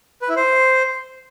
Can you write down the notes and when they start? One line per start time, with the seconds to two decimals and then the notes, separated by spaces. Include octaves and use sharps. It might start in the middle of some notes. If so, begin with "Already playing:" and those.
0.22 B4
0.29 E4
0.36 C5